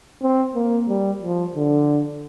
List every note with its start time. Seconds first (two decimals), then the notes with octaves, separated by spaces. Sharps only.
0.22 C4
0.55 A#3
0.88 G3
1.22 F3
1.55 D3